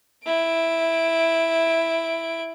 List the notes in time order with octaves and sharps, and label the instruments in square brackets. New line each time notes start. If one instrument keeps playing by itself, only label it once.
[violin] E4 D7